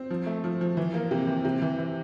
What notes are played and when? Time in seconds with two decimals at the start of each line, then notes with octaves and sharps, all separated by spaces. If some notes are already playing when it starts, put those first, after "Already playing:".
Already playing: C4
0.10 F3
0.26 A3
0.44 F3
0.61 F3
0.77 E3
0.94 A#3
1.11 C3
1.27 E3
1.45 C3
1.62 E3
1.78 E3